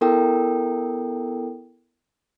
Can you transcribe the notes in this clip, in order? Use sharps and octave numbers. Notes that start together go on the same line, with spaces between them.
B3 E4 A4 A#4 G5